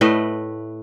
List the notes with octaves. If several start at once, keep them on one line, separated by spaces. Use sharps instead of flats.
A2 A3 B4 D#5